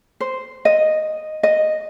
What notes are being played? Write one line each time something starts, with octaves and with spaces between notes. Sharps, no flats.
C5
D#5
D#5